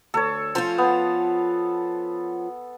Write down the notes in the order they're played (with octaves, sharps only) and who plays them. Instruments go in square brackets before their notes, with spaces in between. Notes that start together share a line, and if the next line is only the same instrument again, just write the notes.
[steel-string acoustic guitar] D2 [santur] A4 C#5
[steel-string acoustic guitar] F3 C#4 F4 [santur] C5 A5 C6
[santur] B3